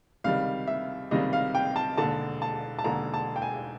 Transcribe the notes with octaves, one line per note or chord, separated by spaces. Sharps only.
C#2 C3 D#3 G3 F5
E5
C#2 C3 D#3 G3 D#5
F5
G5
A5
E1 D#2 D3 A5
A5
A5
E1 D#2 D3 A#5
A5
G5
G#5